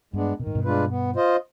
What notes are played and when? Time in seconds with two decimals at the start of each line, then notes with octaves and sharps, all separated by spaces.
0.13 G2 G#3 B3 D4
0.39 B2 D#3
0.47 G#2
0.55 G2 B2
0.65 G#3 D4 F4 B4
0.90 B3
1.16 F4 C5 D#5